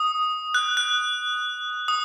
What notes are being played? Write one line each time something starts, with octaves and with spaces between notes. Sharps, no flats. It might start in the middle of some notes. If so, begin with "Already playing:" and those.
Already playing: D#6
F#6
F#6
D#6